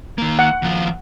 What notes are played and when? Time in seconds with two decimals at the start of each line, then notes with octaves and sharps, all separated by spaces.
0.18 D#3 A#3
0.39 F#5
0.62 D#2 F3